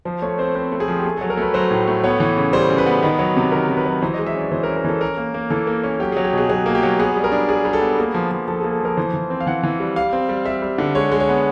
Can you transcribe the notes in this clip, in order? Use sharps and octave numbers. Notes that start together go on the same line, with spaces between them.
F3 C5
A3 C#5
C4 C5
C4 B4
A3
G#4
F3
G4
A3 G#4
F#3 A4
A#4
A3 B4
F#3 C5
A2
A3
B3 C#5
E3
C#3
G3 C5
C#3
B4
B3
D#3
F#3
C3
D#3 A#4
C3
B4
F#3
E3 C5
G#3 D#5
E5
C#4 D5
E3 C5
A#4
C#4
A#4
E3 A4
C#4 A#4
A#3
A#3
E3 A4
A#3
C#4
F#3 G4
F#3 G#4
G4
B2 G#4
F#3 G#4
A#3
G4
F#3
B3 G#4
G3
A#4
D4
G3 G#4
G3
A4
B3
A#3 G#4
F3
F3
F3 A4
A#3 G#4
A4
F3 A#4
E3 C5
E3
C4
F5
E3 F#5
E3
G3
G3 F5
C4
G3
G3 E5
G3
D3
G#3 C#5
G#3
C#5
B3